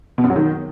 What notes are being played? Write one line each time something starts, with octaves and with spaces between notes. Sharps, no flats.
B2
F#2
F#3
D#3